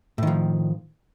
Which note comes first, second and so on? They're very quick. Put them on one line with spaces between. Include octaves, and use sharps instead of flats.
A2 D#3 F3